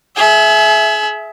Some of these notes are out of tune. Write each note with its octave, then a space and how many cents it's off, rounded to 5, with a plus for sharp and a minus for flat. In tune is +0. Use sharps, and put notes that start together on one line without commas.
G#4 +35 E5 +0